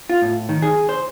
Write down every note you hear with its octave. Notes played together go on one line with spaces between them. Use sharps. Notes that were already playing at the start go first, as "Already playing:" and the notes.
F4
A2
D#3
G#4
C5